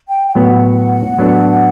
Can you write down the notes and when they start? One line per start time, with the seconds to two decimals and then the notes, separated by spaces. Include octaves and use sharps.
0.08 G5
0.28 G5
0.35 A2 F#3 B3 F#5
1.18 A2 F#3 B3 D4 A4